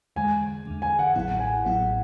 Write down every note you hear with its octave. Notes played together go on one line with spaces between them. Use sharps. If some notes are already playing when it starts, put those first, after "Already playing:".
E2 D3 G#3 G#5
E2 D3 G#3
G#5
F#5
A1 A2 F#3 B3 E4 F#5
G#5
A1 A2 F#3 B3 E4 F#5